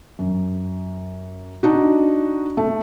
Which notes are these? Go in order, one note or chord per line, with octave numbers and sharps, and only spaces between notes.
F#2
D4 D#4 F#4
A3